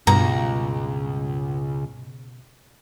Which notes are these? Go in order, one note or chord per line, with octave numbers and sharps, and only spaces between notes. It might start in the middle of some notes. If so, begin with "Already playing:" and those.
C#2 G2 B2 A#5